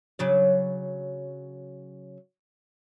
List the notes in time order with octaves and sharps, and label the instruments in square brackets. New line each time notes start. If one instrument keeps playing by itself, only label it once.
[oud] C#3 F#3 D5